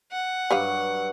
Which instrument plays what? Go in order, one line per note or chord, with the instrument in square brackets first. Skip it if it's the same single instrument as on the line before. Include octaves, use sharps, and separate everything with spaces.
[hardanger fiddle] F#5
[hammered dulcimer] G2 F#3 C#6 [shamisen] G4 B4 F5